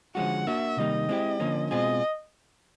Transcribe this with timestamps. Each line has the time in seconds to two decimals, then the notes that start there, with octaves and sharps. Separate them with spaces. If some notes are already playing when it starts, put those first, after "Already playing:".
0.15 D3 F3 G#3 C#4 F#4 F#5
0.47 A#3 D4 F#4 E5
0.77 C3 D#3 G3 A#3 D#4 D#5
1.09 G#3 C4 E4 G4
1.40 D3 F3 A#3 C#4
1.71 B2 G#3 C4 F4 G#4 D#5